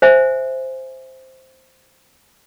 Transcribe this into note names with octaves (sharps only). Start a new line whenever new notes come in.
C5 E5 G#5